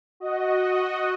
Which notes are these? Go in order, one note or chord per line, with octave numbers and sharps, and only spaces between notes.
F#4 D#5